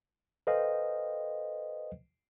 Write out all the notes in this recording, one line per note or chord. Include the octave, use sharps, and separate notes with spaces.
A4 B4 C5 D#5 F5 G5